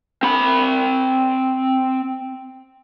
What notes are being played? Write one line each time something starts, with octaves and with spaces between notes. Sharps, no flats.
C4 B5